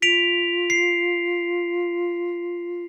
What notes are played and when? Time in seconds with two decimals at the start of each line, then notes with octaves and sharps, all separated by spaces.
0.02 F4 B6 D7 F7
0.70 C7